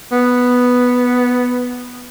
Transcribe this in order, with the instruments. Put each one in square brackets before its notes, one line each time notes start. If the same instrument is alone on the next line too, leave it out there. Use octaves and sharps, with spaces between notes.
[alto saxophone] B3